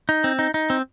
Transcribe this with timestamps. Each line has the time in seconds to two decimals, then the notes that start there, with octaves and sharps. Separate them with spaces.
0.09 D#4
0.24 C4
0.39 D#4
0.54 D#4
0.70 C4